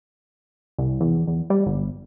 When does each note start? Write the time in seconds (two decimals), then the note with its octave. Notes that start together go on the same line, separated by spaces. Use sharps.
0.78 C2
1.00 E2
1.27 E2
1.50 G3
1.66 G1